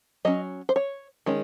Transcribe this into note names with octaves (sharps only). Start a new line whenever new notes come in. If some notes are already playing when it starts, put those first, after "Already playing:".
F#3 C#4 D#5
C5
C#5
D#3 G#3 C#4